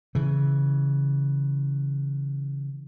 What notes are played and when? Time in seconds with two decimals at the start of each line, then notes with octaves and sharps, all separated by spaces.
0.15 C#3 E3